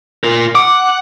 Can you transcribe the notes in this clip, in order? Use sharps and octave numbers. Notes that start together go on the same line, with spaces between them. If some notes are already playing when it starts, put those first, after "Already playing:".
F4 A#4
F#5 D6